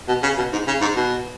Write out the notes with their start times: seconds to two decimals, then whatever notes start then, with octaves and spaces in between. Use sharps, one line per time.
0.08 B2
0.23 C#3
0.38 B2
0.52 G#2
0.67 C#3
0.81 G#2
0.96 B2